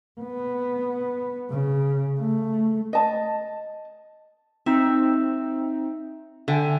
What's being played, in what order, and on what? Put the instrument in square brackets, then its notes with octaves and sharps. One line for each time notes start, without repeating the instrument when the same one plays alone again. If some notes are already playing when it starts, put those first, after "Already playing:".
[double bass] B3
C#3
A3
[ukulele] D#5 A5
[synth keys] C4 D#4 [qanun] E5
[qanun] D3 [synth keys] E5 G5 G#5